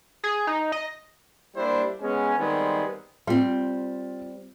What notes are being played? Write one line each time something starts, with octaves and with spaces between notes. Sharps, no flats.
G#4
D#4
D#5
G3 A#3 D4 E4 C5
G#3 B3 C#4
D#3 G3 G#3 B3 C4
G3 C4 F4